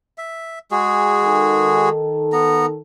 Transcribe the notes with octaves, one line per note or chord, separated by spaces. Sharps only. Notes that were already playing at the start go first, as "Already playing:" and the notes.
E5
G#3 F#4 G#4
D#3 A4
B3 A#5